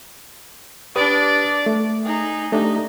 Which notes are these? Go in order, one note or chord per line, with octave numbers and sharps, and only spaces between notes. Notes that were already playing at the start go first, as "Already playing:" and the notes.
D4 G4 B4 D5 D#6
A3
D#4 G#4
A3 D4 D#4 G4